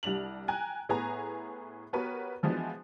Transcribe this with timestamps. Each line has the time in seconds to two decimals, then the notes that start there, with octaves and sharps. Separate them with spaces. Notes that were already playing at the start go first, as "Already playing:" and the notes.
0.03 C2 G3 D4 F7 F#7
0.48 G5 G#5 A#5 F#6
0.89 A2 B3 G#4 B4 G#5 A#5
1.93 B3 F#4 G4 A#4 B4 C#5
2.43 E3 F3 G#3 B3 D4 F#4